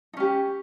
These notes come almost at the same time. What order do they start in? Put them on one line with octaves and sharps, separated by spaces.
D#4 C#4 G4